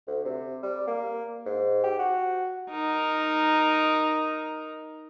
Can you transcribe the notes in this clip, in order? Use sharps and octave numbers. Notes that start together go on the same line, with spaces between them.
D2
C3
G3
A#3
G#2
G4
F#4
D#4 A#4